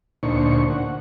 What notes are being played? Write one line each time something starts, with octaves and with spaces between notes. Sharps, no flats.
D2 A#2 D4 D#4 C5 C#6
F#5